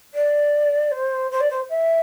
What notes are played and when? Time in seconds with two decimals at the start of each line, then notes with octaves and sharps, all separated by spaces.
0.14 D5
0.92 C5
1.31 C5
1.41 D5
1.50 C5
1.70 E5